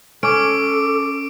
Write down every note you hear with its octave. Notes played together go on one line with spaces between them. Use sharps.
C#4 A4 D6 D7